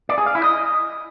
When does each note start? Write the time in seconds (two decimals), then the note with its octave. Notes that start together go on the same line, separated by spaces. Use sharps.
0.09 D5
0.18 G#4
0.26 F5
0.35 E4
0.44 D#5